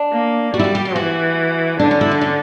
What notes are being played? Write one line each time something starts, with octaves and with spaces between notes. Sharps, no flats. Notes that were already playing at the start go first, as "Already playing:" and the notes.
Already playing: D4
A#3
G3 F#4
E4
F#4
G4
G4
E3 F#4
D3 D4
C#4
E4
D4
C#4